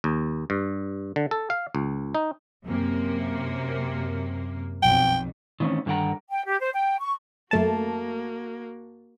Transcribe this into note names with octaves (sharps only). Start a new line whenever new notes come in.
D#2
G2
D3
A4
F5
C#2
D#4
F#2 C3 A#3
B1 F2 G5
D#3 E3 A3 C4 C#4
G2 D3 D#3 F#5 G5 A#5
G5
G4
C5
G5
C#6
F#2 A3 A#3 F#4 A5